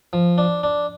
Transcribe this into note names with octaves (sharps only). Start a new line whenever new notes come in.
F3
D4
D4